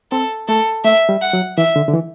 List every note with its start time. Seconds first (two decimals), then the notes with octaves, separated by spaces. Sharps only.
0.11 C4 A4
0.48 A3 A4
0.85 A3 E5
1.09 G3
1.21 F#5
1.33 F#3
1.57 E3 E5
1.76 D3
1.88 D3
1.93 E3